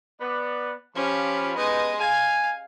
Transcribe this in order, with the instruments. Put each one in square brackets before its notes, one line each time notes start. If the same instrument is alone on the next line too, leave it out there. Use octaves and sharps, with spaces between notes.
[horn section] B3 D5
[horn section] F3 F4 B5 [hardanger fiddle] C#4 G4
[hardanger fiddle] G#3 D#5 [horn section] B3 D#4
[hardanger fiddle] F5 [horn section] G#5